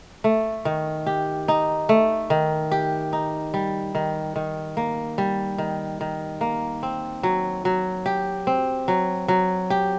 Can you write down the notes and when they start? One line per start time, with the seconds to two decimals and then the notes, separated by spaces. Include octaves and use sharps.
0.24 A3
0.65 D#3
1.06 G4
1.48 D#4
1.89 A3
2.30 D#3
2.71 G4
3.13 D#4
3.54 G3
3.95 D#3
4.36 D#3
4.77 A#3
5.18 G3
5.58 D#3
6.01 D#3
6.41 A#3
6.83 C4
7.23 F#3
7.65 F#3
8.06 G4
8.47 C4
8.88 F#3
9.28 F#3
9.70 G4